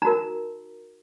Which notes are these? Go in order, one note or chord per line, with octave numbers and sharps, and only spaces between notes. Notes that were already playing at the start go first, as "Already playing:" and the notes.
D#4 F#4 A#4 A#5